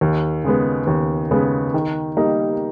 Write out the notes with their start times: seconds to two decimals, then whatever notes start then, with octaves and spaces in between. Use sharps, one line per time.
0.01 D#2
0.44 C#3 G#3 B3
0.87 D#2
1.31 C#3 G#3 B3
1.74 D#3
2.17 G3 A#3 D#4